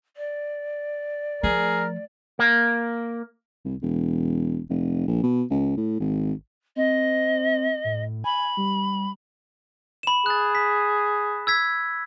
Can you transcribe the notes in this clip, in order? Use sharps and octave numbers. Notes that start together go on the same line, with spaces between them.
D5
F3 A3 G#4 A#4
A#3
C2
E1
F1
A#1
B2
C#2
A2
G#1
C4 D#5
A2
G#5 B5
G3
B5 E7
G#4 F#6 A6
B6
E6 G#6 B6